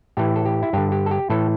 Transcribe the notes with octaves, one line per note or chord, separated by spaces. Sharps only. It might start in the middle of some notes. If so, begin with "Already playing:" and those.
A2 E3 G4
A4
G4
E4
G2 D3 G4
G4
A4
G4
A2 E3 A4